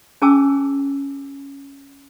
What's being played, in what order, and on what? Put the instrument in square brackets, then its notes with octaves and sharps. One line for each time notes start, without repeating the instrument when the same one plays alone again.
[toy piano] C#4 G#4 G#5 A5 D6 E6